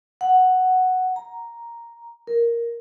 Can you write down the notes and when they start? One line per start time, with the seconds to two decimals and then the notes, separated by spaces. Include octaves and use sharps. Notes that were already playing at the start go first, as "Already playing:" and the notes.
0.21 F#5
1.16 A#5
2.27 A#4